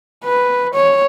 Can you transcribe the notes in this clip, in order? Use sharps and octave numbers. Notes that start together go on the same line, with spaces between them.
B4
C#5